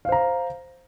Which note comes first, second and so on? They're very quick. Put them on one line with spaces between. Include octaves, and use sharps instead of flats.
F5 C5 A#5